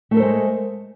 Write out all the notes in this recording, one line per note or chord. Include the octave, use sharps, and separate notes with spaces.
G#3 A3 A4 A#4 C5